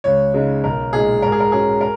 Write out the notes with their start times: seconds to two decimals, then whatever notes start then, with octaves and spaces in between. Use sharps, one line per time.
0.04 C#2 C#5
0.34 C#3 G#3 D#4
0.64 B1 A#4
0.93 A#2 G#3 D#4 G#4
1.22 G#2 A#4
1.32 G#4
1.40 A#4
1.52 F#3 C#4 G#4
1.81 A#4